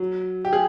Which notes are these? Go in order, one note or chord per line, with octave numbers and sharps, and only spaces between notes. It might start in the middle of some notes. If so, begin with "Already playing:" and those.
Already playing: F#3
G4
G#4